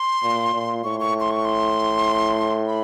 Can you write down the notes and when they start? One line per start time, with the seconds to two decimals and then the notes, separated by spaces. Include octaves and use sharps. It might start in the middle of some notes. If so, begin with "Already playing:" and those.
Already playing: C6
0.24 A#2
0.53 A#2
0.84 A2 C#6
1.00 C#6
1.20 C6
1.31 C#6
1.45 C6
2.67 B5